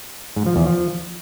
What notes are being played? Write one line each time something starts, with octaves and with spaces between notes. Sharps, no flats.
G#2
F3
E2
F3